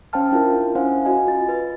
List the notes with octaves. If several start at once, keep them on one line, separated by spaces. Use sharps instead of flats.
C#4 C5 F5 G5 A5 F6
D4 E4 F4 A#4
C#4 E4 C5 F5 F#5 G#5
F#4 D#5 G#5
F4 D#5 A6
B4 A6